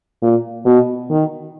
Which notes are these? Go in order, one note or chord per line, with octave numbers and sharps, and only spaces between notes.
A#2
B2
D#3